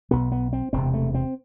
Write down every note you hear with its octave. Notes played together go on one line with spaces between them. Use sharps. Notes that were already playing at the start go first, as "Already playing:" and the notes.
B1 B2 B3
B3
C4
E1 E2 C3 C4
A3
C4